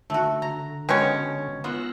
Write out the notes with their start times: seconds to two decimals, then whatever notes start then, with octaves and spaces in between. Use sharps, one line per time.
0.10 D3 A3 F#4
0.42 A#5
0.89 B2 G#3 C#4 G4 C#5
1.64 B3 F4 E6 F#6 A#6